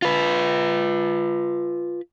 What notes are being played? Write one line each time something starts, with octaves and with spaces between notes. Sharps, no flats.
F4 B4